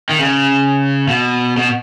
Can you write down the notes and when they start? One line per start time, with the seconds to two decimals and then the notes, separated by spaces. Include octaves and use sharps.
0.09 D#3
0.19 C#3
1.08 B2
1.57 B2